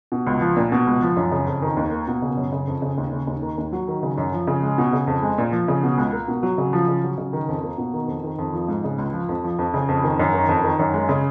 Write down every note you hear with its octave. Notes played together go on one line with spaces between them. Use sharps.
B2
C#2
F3
A#2
B2
C#2
F3
F#2
C#3
F2
D#3
D#2
A#3
B2
C#3
F#2
C#3
F2
C#3
D#2
C#3
D#2
D#3
D#2
F#3
D#3
C#3
F#2
F3
C#3
G#3
B2
C#3
F2
G#3
A#2
F3
C#3
B2
C#2
A#3
B2
F#3
C#3
F3
C#3
F#3
C#3
D#3
F2
A#3
B2
D#3
F2
D#3
F2
F3
G#2
C#3
C#2
F3
F2
F3
F2
C#3
F2
D#3
F#2
D#3
F2
D#3
F#2
G#3
C#3